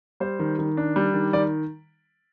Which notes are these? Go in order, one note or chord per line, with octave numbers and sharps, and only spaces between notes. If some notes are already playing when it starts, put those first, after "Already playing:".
G3 C5
D#3
D#3
D4
G3
D#3
D#3 D5